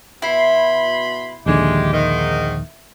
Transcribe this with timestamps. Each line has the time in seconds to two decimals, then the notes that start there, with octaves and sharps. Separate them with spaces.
0.22 B2 E4 B5 C6
1.46 A#1 D#2 D3 G#3 G4
1.92 G#2 D#3